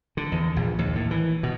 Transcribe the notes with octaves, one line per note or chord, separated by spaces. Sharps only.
D3
E2
A#1
D#2
A2
E3
B2